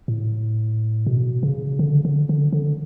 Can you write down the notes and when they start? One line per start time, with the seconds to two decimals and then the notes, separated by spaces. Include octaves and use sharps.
0.08 A2
1.07 B2
1.43 C#3
1.79 D3
2.05 D3
2.29 D3
2.53 D3